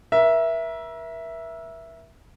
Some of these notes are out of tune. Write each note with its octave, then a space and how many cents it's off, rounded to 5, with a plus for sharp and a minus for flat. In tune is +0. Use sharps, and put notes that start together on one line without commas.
A#4 +40 E5 +0